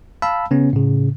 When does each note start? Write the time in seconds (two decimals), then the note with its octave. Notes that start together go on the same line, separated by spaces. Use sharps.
0.22 F5 A5 B5 E6
0.51 C#3 B3 C#4
0.73 A2 C#3